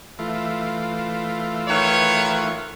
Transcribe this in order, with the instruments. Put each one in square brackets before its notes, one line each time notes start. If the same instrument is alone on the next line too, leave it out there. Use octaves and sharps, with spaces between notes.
[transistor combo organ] E3 A3 F4
[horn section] D#3 B4 C#5